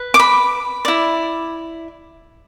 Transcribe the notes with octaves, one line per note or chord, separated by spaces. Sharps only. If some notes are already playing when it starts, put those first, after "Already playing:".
Already playing: B4
D6
B5
E4 D5